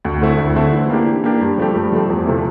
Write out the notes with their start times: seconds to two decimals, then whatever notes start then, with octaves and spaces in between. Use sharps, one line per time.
0.05 D2
0.21 D3 A3 C4 E4
0.38 D2
0.56 D3 A3 C4 E4
0.73 E3
0.90 A#3 D4 G4
1.07 E3
1.24 A#3 D4 G4
1.41 G2
1.58 F3 A3 C4 G4
1.75 G2
1.92 F3 A3 C4 G4
2.09 E2
2.26 C3 F3 A3 E4